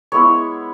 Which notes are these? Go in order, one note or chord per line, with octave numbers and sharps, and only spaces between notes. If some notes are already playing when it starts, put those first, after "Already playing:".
G#3 B3 E4 C#5